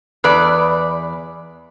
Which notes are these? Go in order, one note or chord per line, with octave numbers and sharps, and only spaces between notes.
E2 B4 D5